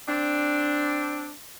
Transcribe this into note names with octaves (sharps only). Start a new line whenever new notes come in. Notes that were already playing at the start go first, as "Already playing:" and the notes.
C4 D4